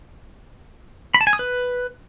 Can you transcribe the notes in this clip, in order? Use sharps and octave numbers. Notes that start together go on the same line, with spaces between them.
B5
A5
G#5
D#6
B4